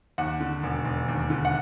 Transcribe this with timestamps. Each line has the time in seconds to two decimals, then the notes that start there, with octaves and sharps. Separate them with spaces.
0.18 D#2 F#5
0.40 D3
0.63 E1
0.85 E1
1.08 D#2
1.30 D3
1.45 F#5